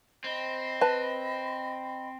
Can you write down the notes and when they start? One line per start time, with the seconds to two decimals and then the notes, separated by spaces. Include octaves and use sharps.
0.24 C4 D#5 B5
0.81 B4 A5